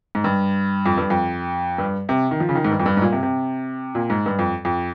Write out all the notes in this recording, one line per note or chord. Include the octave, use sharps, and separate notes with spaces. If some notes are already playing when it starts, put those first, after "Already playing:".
G#2
G2
F2
G2
F2
G2
C3
D#3
F3
C#3
D#3
G#2
G2
F2
G2
G#2
A#2
C3
C3
A#2
G#2
G2
F2
F2